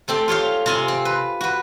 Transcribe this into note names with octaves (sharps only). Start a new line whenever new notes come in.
A3 C4 G4 A4
F4 G4 C#5 F5
C3 F4 G#5
C4
B4
F#4 B4